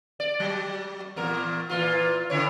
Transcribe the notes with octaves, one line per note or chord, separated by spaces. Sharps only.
D5
F#3
E2 A#2 A#4
A#2 E3 F4
C#3 E4 C#5